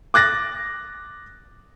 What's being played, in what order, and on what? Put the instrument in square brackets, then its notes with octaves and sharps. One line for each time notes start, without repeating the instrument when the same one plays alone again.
[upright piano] D6 F#6 A6 A#6